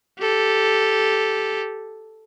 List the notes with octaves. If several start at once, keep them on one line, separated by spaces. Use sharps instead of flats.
G4 A4